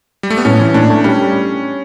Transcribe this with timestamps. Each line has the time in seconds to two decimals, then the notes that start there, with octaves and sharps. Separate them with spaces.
0.23 G3
0.30 A3
0.38 B3
0.45 A2 C#4
0.60 E3
0.74 A2 D4
0.89 A3
1.04 G3 C#4